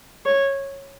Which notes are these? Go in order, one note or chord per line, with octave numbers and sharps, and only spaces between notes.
C#5